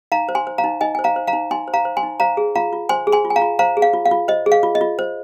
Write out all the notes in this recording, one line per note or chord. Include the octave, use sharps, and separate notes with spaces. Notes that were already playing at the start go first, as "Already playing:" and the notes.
D#4 F5 A#5
C5
G#5 C6
C5
F5 A#5
D#4
D#4 D#5 G#5
C5 G#5
F5 A#5
C5
F5 A#5
D#4
D#4 G#5 C6
C5
F5 A#5
C5
G#5 C6
D#4
C5 F5 A#5
G#4
F4 F5 A#5
F4
C5 G#5 C6
G#4
G#5 C6
F4
G#5
F5 A#5
F4
C5 F5 A#5
G#4
F5
F4
F5
F4
C5 D#5
G#4
F5
F4
D#5
F4
C5